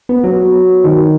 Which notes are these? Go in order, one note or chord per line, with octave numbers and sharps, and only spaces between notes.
B3
F#3
D#3